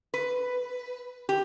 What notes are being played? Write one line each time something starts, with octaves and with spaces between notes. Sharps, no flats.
B4
G4